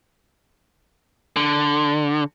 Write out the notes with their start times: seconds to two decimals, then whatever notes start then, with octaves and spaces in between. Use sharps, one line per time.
1.36 D3